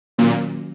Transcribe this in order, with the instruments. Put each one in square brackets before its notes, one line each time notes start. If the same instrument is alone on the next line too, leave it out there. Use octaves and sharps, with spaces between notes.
[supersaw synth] A#2 [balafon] D#3 F#3 A#3 C#4 F#4